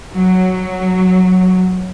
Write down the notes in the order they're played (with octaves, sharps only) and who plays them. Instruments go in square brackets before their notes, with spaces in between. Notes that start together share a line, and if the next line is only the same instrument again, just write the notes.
[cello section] F#3